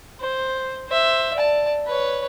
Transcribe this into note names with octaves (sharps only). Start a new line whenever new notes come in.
C5
C5 E5
D5 A5
B4 C#5